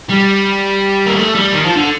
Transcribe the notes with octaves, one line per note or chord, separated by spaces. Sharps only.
G3
A#3
A3
G3
D#3
F3
D3